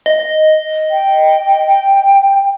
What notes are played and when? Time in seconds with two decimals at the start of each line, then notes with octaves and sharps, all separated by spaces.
0.06 D#5
0.91 G5